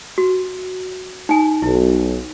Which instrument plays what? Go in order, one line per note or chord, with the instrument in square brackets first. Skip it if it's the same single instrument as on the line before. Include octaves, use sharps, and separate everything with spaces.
[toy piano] F#4
D#4 G#5
[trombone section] B1 [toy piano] E4